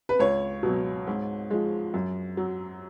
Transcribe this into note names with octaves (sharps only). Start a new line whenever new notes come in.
B4
C#2 C#5
B2 F#3
G#2
F3 G#3
F#2
F#3